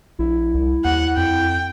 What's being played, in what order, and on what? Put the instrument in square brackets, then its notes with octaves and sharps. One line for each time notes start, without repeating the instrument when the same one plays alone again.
[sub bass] A#1 [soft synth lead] E4
[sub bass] C2
[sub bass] D#2 [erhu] F#5
[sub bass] F2 [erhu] G5